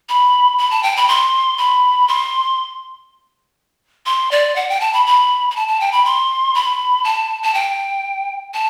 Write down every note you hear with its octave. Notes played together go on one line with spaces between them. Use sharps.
B5
B5
A5
G5
B5
C6
B5
C6
C6
D5
F#5
G5
A5
B5
B5
B5
A5
A5
G5
B5
C6
B5
A5
A5
G5
A5